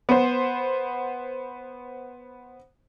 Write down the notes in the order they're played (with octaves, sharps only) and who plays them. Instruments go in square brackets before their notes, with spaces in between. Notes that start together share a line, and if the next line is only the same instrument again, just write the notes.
[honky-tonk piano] B3 C5